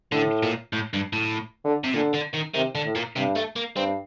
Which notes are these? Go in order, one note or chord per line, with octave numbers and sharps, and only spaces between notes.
A2 D3
A#2
A2
G2
A2
D3
C3
A#2 D3
D3
D#3
C3 D#3
D3
A2
A#2
G2 C3
A3
A#3
G2 C4